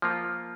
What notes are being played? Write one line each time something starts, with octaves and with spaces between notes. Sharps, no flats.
F3 A#3 F4